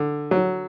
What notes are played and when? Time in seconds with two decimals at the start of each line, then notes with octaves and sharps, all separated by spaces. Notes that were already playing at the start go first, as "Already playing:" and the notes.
Already playing: D3
0.31 F#3